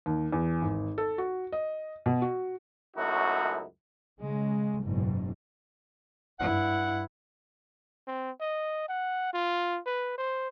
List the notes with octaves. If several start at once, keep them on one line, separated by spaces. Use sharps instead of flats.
D#2
E2
G#1
A4
F#4
D#5
B2
F#4
C#2 F#2 A3 D#4 E4 F#4
C#3 G#3
F#1 G#2 B2
G2 E4 F#5
C4
D#5
F#5
F4
B4
C5